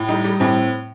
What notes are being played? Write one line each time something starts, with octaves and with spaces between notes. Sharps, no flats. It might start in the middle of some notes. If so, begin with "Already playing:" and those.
Already playing: A2
G3 D#4
G3
A2 C4